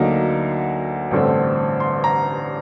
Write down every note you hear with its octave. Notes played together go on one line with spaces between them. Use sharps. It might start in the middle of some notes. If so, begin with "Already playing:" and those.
Already playing: D2 D3 F#3 A#3 D#4 A#5
A1 G2 D3 A3 C4
C6
A#5